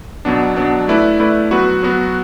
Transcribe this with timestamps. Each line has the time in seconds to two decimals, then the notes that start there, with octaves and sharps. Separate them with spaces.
0.25 B2 F#3 B3 D4
0.56 B2 F#3 B3 D4
0.88 A3 E4 B4 D5
1.20 A3 E4 B4 D5
1.51 F#3 B3 F#4 B4
1.83 F#3 B3 F#4 B4